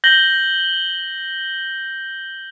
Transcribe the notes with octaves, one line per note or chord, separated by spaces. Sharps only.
G6 A#6 F#7 G7